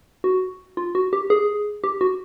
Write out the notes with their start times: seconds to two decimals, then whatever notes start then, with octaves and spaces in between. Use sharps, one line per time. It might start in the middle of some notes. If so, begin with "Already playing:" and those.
0.24 F#4
0.77 F4
0.95 F#4
1.13 G4
1.30 G#4
1.84 G4
2.01 F#4